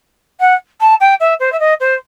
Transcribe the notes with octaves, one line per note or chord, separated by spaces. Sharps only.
F#5
A5
G5
E5
C5
E5
D#5
C5